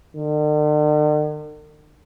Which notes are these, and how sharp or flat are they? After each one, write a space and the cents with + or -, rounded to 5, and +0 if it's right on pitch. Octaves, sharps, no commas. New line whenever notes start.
D3 +45